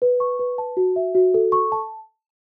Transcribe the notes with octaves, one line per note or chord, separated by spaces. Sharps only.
B4
C#6
B4
A5
F#4
E5
F#4
A4
C#6
A5